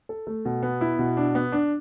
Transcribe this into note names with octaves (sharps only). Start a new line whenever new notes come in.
A4
A3
B2
B3
E4
B2
D4
B3
D4